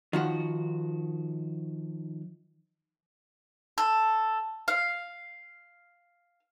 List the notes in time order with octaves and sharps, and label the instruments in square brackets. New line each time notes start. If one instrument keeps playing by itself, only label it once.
[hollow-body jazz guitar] D#3 F3 F#4
[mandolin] A4
F5